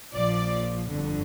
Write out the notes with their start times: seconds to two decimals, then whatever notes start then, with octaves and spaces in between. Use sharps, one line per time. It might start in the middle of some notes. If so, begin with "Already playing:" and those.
0.14 A#1 A#2 F3 D5
0.89 G1 F2 D3